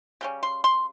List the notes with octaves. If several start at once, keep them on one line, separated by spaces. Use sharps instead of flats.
C#3 G3 C#4
C6
C6